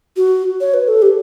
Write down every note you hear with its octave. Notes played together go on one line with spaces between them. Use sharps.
F#4
C#5
B4
A4
G4